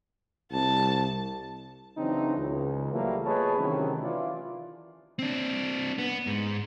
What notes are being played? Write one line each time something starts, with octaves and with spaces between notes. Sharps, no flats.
C2 A5
C#3 E3 F#3 C4 D4 D#4
C#2
E3 F#3 G3 A3 A#3 F4
B3 G#4 B4 C#5 D#5 A5
C3 D#3 E3 F#3 A3 C#4
E3 E4 F4 D5
C4 D4
B3
G#2